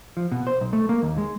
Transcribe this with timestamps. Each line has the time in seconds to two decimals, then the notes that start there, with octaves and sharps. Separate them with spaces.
0.17 F3
0.32 B2
0.47 C5
0.61 B1
0.73 A3
0.89 A#3
1.03 D#2
1.18 G#3